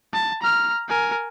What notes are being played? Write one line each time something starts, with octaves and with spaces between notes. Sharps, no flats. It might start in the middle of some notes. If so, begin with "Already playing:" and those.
A5
A#5 F6
A#4 G#5